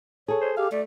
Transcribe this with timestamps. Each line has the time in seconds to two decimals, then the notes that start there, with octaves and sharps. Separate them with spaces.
0.28 G#4 A4 C#5
0.42 C5
0.57 G4 F5
0.72 A3 D5